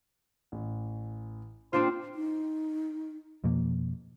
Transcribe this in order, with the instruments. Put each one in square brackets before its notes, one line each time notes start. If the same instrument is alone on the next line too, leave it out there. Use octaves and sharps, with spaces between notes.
[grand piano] A1
[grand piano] A#2 [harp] C4 D4 F4 [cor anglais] C5
[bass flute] D#4
[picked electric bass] F2 B2 F3 A#3